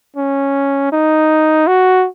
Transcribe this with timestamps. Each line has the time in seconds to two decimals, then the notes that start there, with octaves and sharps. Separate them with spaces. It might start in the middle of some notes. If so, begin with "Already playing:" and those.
0.16 C#4
0.92 D#4
1.67 F#4